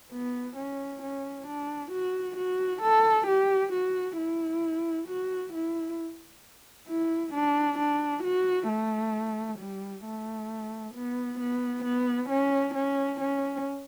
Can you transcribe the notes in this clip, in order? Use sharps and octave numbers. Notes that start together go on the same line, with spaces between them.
B3
C#4
C#4
D4
F#4
F#4
A4
G4
F#4
E4
F#4
E4
E4
D4
D4
F#4
A3
G3
A3
B3
B3
B3
C#4
C#4
C#4